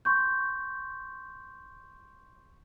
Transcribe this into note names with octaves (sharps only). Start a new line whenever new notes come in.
C6 C#6 G6